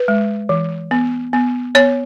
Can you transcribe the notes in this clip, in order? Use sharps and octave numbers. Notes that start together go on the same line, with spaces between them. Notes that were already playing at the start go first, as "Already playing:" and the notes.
Already playing: B4
G#3
E3
B3
B3
B3 C#5